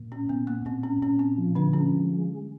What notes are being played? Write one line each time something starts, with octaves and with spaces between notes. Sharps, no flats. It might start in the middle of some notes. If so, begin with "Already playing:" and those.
Already playing: A#2
C#4
A#2 B3
A#3
A#2 C4
C#4
A#2 C#4
C4
F3
D3 D4
G#3 C#4
G#3